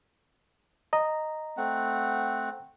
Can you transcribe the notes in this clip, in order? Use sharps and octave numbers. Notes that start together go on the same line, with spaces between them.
D#5 A#5
A3 C4 F#5